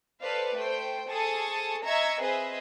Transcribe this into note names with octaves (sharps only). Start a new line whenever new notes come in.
A4 B4 C5 D5 F5
A3 C5 G5
G#4 A4 C5 A5 C#6 D#6
D#5 E5 A#5 C#6 E6 G#6
C4 G#4 B4 C5 D#5 E5